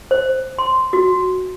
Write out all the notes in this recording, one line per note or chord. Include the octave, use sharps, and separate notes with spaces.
C5
C6
F#4